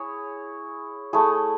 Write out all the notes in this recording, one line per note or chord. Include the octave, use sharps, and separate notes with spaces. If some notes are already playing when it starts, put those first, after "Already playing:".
Already playing: E4 G#4 C#5
A3 E4 G#4